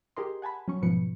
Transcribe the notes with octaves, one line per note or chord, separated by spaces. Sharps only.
G4 G#4 A#4 D#5 C6
F#5 G#5 A5 B5
F#3 C#4 C#6
G#2 B2 F3 B4 C#7